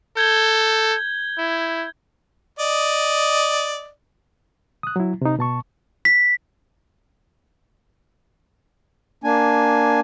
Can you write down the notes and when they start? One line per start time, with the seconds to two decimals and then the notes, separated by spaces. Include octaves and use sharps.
0.17 A4 G6 G#6 G7
1.39 E4
2.59 D5 D#5
4.83 D#6 F#6
4.96 F#3 E4
5.22 C3 D#4
5.39 B2 A5 C#6
6.05 B6
9.24 A#3 D4 G#5